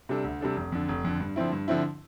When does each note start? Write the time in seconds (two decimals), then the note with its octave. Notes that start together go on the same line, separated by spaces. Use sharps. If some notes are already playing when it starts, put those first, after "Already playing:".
0.09 C3 G3 D4 A4
0.24 D2
0.41 C3 G3 D4 A4
0.56 F1
0.72 F2 D3
0.89 F1
1.05 F2 D3
1.20 G2
1.36 D3 F3 C4 E4
1.52 G2
1.68 D3 F3 C4 E4